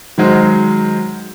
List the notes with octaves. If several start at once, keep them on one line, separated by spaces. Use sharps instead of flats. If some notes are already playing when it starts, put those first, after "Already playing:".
D#3 F#3 G#3 C5